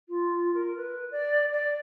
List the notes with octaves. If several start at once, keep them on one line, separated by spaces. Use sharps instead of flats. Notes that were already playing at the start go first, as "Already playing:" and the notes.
F4
A#4
B4
D5
D5